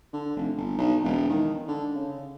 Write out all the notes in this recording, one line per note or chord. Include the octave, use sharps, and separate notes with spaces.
D3
F1
G1
B1
E1
D#3
D3
C#3